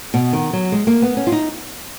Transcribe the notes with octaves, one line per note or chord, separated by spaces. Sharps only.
B2
D#3
F#3
G#3
A#3
B3
C#4
F4
D#4